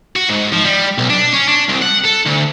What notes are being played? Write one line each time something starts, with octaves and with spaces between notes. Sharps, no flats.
F#4
G#2
F3
G3
B1
D4
C#4
D4
C2
F#5
A4
D2